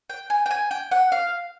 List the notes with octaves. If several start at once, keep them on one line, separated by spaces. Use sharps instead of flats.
G5
G#5
G5
G#5
G5
F#5
F5